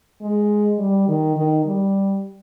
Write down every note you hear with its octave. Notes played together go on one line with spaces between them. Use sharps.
G#3
G3
D#3
D#3
G3